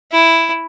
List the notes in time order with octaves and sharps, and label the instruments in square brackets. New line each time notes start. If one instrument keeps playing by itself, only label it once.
[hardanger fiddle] E4